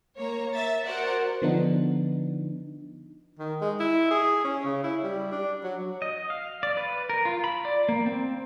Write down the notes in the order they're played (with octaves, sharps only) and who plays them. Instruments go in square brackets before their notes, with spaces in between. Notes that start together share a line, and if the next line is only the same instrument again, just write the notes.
[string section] A#3 C#5 A#5
E5 A6
F#4 A#4 C5 D5 F#5
[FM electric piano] D3 F3 B3 D4 D#4
[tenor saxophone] D#3
G#3
E4
G#4
C#4
C#3
E4
G3
D4
F#3
[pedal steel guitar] D#5
F5
D5
B4
A#4
F4
B5
D5
A#3
C4